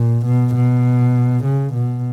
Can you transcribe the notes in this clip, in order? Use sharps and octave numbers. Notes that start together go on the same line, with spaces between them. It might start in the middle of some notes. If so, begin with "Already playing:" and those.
Already playing: A#2
B2
B2
C#3
B2